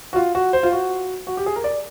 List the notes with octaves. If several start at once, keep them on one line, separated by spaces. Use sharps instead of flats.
F#4
F4
F#4
C5
F4
F#4
F#4
G4
G#4
A#4
D5